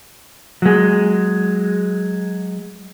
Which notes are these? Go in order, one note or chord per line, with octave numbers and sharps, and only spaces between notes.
F#3 G#3